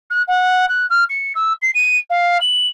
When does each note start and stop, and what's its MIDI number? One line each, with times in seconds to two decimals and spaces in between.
0.10 0.22 90
0.28 0.65 78
0.69 0.86 90
0.90 1.04 89
1.09 1.33 97
1.35 1.53 88
1.62 1.71 96
1.74 1.97 99
2.10 2.38 77
2.41 2.66 102